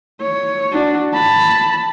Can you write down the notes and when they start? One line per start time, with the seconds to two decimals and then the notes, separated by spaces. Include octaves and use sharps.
0.21 C#5
0.73 D4 F#4
1.14 A5 B5